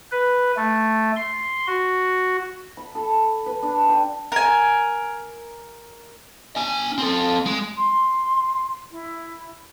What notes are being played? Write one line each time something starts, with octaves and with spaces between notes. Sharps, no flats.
B4
A3
C6
F#4
B5
A4
B4
D4
G5
A#4 G#5
D4 G#5
C4 A4
G#3
C6
E4